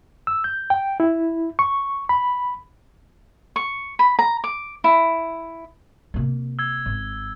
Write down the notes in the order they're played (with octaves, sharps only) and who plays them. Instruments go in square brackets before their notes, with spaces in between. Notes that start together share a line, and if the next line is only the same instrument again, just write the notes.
[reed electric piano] E6
G6
G5
E4
C#6
B5
[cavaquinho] C#6
B5
A#5
D6
E4
[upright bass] C3 A#3
[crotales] E6 G#6
[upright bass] G#1